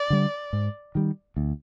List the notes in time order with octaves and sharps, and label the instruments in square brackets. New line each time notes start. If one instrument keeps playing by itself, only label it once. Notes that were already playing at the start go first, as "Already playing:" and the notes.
Already playing: [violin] D5
[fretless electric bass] D3 G3
G#2
D#3 G3
D2